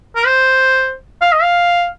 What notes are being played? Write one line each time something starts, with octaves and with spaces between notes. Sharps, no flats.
A#4
C5
F5
D#5
F5